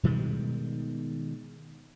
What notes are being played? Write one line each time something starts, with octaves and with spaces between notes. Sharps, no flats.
B2 D#3 G3 G#3